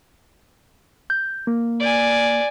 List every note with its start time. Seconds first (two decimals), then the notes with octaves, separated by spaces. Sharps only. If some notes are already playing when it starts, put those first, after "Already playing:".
1.10 G6
1.47 A#3
1.80 D5 G#5